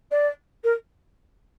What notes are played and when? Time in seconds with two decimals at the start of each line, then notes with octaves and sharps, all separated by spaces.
0.11 D5
0.64 A#4